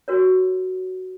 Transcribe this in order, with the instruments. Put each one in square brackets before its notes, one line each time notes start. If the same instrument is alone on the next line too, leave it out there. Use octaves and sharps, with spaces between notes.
[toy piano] F#4 A#4 C#5